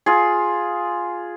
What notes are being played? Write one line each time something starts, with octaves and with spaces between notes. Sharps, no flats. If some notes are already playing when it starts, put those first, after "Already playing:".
F4 G#4